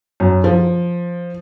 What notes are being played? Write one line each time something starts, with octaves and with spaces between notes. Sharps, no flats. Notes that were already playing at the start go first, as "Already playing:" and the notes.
F#2
F3